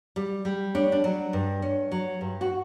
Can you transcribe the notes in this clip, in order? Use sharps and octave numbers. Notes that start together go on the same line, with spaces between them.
G3
G3
C#4 D4
D4
F#3
G2
C#4
F#3
G2
F#4